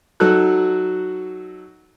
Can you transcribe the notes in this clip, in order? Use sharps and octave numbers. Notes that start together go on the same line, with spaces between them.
F#3 D#4 F#4 A4 F#6